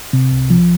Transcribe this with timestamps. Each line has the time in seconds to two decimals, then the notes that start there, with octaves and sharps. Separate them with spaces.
0.13 C3
0.32 C2
0.50 F3